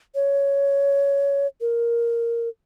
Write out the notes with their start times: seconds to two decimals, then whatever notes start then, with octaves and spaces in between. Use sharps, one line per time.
0.15 C#5
1.61 A#4